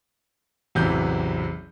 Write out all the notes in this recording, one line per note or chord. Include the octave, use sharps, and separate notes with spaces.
A1 E2 C3 E3 F#3 G6